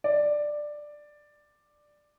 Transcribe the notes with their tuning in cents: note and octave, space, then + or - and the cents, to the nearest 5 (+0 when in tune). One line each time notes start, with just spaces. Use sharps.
D5 +10